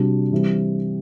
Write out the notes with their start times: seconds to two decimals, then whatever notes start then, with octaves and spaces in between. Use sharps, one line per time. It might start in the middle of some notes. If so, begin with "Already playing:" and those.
Already playing: C3 G3 D4 F#4
0.32 E3 G3 C4 E4